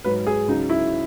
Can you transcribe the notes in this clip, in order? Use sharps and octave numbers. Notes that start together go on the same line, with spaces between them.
G#2 F#3 B4
G#4
C#2 C#3 F#3 D#4
E4